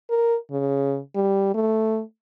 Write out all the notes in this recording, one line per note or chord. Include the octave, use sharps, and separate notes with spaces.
A#4
C#3
G3
A3